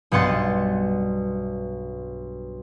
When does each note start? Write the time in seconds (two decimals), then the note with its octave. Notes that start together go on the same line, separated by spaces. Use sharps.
0.12 B1 G2 B3 F#5 C6 A6